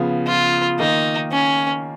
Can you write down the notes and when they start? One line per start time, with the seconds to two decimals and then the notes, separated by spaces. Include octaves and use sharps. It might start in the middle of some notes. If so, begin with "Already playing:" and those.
Already playing: C#3 F3 B3 F4
0.27 F4
0.79 D#3 A#3 D#4 F4
1.32 C#4